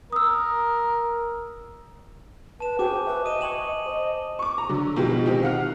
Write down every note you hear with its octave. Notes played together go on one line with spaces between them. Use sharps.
A#4 D#6 E6
B4 A5 E7
F#4 G#4 C5 G5 D6 E7
B4 E5
D#5 D#6 D#7 E7
G5 G#5 C#6 E7 F#7
C5 D#5 D#6
C#6 D6
A#5
D3 F#3
B2 F3 G#3 D#4 F4 G4
D#3 C4 D#4 G4
F5 F#5 F6